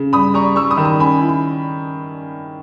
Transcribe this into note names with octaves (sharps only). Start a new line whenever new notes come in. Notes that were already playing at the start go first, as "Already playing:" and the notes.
Already playing: C#3
G2 B5 D#6
G3 A#5 C#6
G3 C#6 E6
B5 D#6
D#3
B5 D#6
C#4 G#5 B5
E4
B5